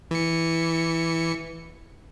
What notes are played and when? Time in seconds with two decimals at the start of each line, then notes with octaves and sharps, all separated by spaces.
0.11 E3 C#7